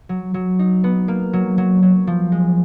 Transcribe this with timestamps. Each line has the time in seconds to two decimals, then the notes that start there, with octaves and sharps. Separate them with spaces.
0.09 F#3
0.34 F#3
0.59 D#4
0.84 B3
1.08 A#3
1.33 F#3
1.58 F#3
1.82 F#3
2.07 F3
2.32 G#3